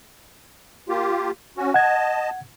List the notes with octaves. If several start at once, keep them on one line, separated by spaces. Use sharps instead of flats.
A#3 F4 G4
C#4 F#4
D#5 F#5 A5 G#6